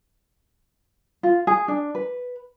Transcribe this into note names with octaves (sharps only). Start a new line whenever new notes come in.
F4
G#4
D4
B4